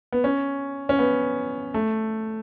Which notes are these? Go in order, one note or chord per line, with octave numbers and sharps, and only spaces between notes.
B3
C#4
C#4
B3
A3